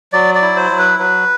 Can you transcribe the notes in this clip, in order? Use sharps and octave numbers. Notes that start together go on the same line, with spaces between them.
F#3 D5
D5
E4
C5
F#3
B4
F#3 B4